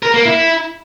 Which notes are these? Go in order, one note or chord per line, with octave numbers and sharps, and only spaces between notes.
A#4
A#3
E4